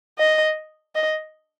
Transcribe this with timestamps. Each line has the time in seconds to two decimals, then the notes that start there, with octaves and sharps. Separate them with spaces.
0.19 D#5
0.95 D#5